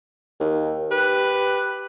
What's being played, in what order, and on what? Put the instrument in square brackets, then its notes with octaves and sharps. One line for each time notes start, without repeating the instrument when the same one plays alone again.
[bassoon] D#2
[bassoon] G4 [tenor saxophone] B4